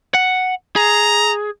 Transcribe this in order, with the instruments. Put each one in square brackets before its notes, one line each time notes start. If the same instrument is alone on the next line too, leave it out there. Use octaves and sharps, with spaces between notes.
[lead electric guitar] F#5
[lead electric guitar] G#4 [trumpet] A#5